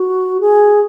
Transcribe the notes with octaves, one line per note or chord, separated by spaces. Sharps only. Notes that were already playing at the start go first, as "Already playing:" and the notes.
Already playing: F#4
G#4